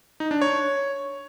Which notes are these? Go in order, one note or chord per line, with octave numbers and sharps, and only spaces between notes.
D#4
D4
C#5